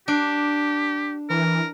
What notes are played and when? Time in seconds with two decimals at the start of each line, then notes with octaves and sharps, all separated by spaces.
0.08 D4 G4
1.30 E3 A#4